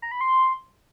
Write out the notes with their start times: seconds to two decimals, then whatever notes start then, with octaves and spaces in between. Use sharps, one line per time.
0.02 A#5
0.12 B5
0.21 C6